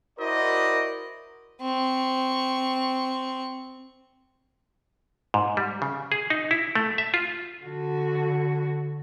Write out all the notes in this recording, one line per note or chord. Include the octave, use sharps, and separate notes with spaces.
E4 F#4 A#4 C5 D5 D#5
C4 C#6
G#2
G3
C#3
G#4
D#4
E4
A3
E5
F4
D3 F#4